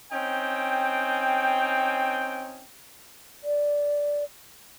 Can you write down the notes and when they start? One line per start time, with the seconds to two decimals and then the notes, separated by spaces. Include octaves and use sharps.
0.12 C4 C#4 D#4 G5
3.44 D5